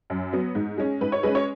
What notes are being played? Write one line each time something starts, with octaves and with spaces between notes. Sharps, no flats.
F#2
F#3 B3
G#2
G#3 C#4
G#2 B4
C#5
G#3 C#4 B4
C#5